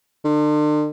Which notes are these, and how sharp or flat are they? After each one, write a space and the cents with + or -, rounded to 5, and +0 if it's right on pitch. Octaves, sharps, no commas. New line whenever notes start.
D3 +40